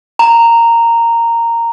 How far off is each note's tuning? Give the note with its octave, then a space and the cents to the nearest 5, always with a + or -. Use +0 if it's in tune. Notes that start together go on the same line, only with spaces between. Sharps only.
A#5 -10